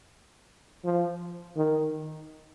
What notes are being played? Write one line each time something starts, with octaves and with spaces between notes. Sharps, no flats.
F3
D#3